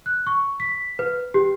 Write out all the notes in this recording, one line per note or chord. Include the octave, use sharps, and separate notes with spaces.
F#6
C#6
B6
B4
G4